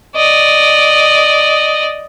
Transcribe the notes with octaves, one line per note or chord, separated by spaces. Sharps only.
D5 D#5